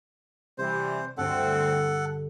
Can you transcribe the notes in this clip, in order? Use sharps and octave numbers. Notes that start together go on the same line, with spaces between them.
C3 E3 G3 C5
D2 G2 D3 C4 A4 F#5